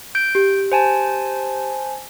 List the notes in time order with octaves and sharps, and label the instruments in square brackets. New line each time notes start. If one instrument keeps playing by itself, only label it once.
[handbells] G6 D7
[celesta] G4
[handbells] C5 G#5 A5